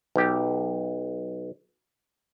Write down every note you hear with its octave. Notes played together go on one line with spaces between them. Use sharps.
B1 G4